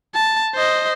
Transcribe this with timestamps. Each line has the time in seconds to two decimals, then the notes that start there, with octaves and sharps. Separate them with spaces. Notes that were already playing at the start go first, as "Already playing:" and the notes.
0.14 A5
0.55 C5 D#5